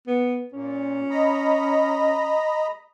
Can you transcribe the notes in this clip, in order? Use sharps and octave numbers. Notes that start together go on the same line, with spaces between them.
B3
A#2 C#4
D#5 A#5 B5